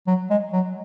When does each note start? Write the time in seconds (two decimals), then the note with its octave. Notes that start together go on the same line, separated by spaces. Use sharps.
0.07 F#3
0.30 G#3
0.53 F#3